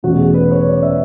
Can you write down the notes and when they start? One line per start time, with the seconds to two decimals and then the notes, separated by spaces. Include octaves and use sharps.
0.03 E2 B2 A3 C#4 F#4
0.19 G#4
0.34 B4
0.51 C#5
0.66 D5
0.82 E5